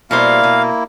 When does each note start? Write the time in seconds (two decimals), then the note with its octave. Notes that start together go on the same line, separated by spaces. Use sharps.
0.11 B2 G3 A#3 E4 C5 F5
0.43 B2